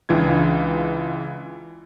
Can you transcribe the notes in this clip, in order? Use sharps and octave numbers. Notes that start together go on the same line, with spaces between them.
C#2 E3 D4 F4 G#6